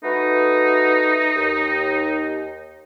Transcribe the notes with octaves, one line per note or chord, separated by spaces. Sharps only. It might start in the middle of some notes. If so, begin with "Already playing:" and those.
A3 D#4 F#4 B4
D#2